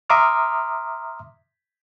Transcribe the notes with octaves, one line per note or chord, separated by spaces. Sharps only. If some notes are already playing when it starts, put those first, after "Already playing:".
E5 A#5 C6 D6 D#6 F6